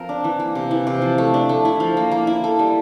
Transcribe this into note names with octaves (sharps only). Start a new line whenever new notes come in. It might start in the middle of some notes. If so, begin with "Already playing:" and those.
Already playing: F3 C4 A#4
D4
E3
A#3
C3
E3
C3
F3
A3
D4
A3
E4
F3
A#3
A#3
E4
A4
G3